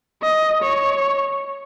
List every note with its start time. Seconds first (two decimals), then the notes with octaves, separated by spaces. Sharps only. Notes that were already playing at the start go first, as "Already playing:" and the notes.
0.22 D#5
0.63 C#5